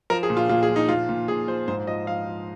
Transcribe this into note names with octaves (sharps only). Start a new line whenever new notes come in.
F3 A#4
G#4
A#2
F4
A#2 F4
G#4
F3
D#4
A#2 F4
A#2
A#2 G#4
F3 C5
G#2 C5
F3 D#5
F3 F5
F3